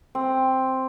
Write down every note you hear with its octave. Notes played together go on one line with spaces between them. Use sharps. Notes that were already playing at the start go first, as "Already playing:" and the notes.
C4